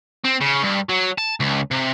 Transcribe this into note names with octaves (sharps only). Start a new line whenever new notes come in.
C4
C#3
G2
F#3
A5
C#2
C3